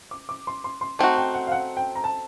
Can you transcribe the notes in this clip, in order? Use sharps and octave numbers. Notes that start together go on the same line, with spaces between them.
D6
D6
C6
C6
C6
A3 C4 D#4 F#4
G5
F#5
F5
F#5
G5
A#5
A5